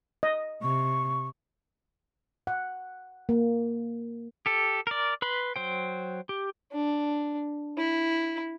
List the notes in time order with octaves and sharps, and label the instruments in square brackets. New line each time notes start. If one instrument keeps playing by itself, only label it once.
[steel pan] D#5
[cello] C3 [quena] C#6
[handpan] F#5
A#3
[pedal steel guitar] G4 A4
A#4 D5
B4 B5 C6
F#3 C5 G5
G4
[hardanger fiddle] D4
E4